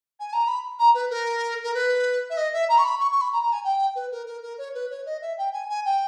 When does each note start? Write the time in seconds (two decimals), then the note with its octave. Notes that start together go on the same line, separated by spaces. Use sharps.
0.20 G#5
0.33 A#5
0.47 B5
0.79 A#5
0.94 B4
1.10 A#4
1.64 A#4
1.74 B4
2.30 E5
2.37 D#5
2.53 E5
2.69 A#5
2.78 C#6
2.84 B5
3.00 C#6
3.11 C#6
3.21 B5
3.33 A#5
3.43 A#5
3.53 G#5
3.64 G5
3.95 B4
4.12 A#4
4.26 A#4
4.43 A#4
4.58 C#5
4.74 B4
4.90 C#5
5.06 D#5
5.22 E5
5.38 G5
5.53 G#5
5.69 G#5
5.85 G5